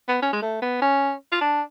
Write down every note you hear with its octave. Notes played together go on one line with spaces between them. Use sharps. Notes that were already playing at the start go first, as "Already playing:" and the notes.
B3
C#4
G#3
A3
B3
C#4
F4
D4